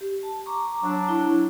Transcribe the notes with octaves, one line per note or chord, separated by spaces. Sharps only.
G4
A5
A#5 C#6 D6
F#3 D4
E4